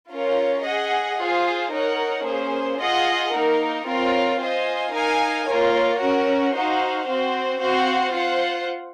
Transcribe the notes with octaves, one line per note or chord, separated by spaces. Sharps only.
C#4 F4 A#4 C#5
G#4 D#5 F#5
F4 G#4 C5
D#4 A#4 C#5 F#5
A#3 C#4 G#4 C5
F4 G#4 D#5 F#5
A#3 D#4 A#4
C4 F4 A#4 C#5 F5
F4 C5 D#5 G#5
D#4 A#4 F5 G#5
A#3 F4 A#4 C#5
C#4 F#4 A#4 C#5
D#4 F#4 C5 F5
C4 F#4 C5
C4 F#4 C5 F5
F4 C5 F#5